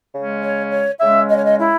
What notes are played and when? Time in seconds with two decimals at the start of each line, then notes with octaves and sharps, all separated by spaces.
0.14 C#3 G#3 C#4
0.43 C#5
0.72 C#5
1.01 C#3 G#3 C#4 E5
1.31 D#5
1.37 C#5
1.46 D#5
1.60 E4